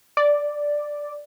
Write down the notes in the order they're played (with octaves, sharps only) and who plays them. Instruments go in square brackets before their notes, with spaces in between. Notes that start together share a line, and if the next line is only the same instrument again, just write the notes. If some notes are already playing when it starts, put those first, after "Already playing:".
[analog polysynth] D5